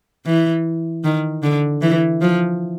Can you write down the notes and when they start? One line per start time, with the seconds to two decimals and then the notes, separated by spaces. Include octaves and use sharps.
0.26 E3
1.04 D#3
1.43 D3
1.82 E3
2.21 F3